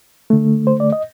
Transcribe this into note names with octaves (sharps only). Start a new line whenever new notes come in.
D3 A3
C5
D5
D#5